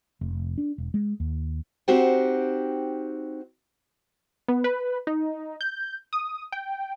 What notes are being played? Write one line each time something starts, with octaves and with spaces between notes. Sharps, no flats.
F1
D4
E1
G#3
D#2
C4 D#4 F#4 G4 C5 G5
B3
B4
D#4
G6
D#6
G5